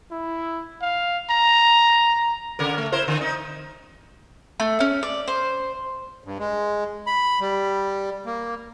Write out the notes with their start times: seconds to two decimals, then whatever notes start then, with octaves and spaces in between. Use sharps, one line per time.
0.11 E4
0.82 F5
1.30 A#5
2.59 C#3 A#4
2.78 A3
2.92 E4 A#4 C5
3.08 D3
3.21 D#4
4.60 A3
4.80 C#4
5.03 D5
5.28 C5
6.23 G2
6.39 G#3
7.07 B5
7.40 G3
8.26 A#3